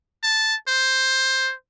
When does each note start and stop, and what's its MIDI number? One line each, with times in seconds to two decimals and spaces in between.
0.23 0.55 81
0.68 1.53 72